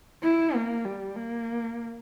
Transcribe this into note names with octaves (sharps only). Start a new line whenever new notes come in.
E4
A#3
G3
A#3